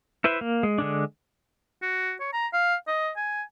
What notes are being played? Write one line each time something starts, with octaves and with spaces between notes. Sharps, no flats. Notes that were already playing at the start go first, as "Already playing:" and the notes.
E4 B4 C5 E5
A#3
G#3
D3 G#3 D4
F#4
C#5
A#5
F5
D#5
G#5